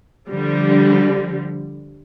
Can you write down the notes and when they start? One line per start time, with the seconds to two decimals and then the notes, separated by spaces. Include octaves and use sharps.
0.29 D3 F3 G3